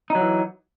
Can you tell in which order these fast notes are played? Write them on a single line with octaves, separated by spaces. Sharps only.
D#4 F#3 E3